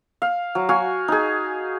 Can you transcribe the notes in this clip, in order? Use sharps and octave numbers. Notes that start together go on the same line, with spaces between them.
F5
F#3
F#4 F5 G#5
D#4 G#4